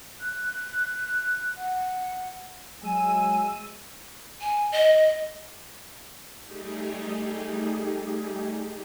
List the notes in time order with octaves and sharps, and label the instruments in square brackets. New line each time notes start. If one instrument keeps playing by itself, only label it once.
[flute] F#6
F#5
[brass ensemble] F#3 G#5 [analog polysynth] G#3 E6 D#7
[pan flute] G#5
D#5
[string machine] G3 A3 D#4 G4 G#4